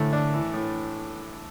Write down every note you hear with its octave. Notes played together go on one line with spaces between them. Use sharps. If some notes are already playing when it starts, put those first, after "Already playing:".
Already playing: A2 D3 E3 A3
D4
E3
A2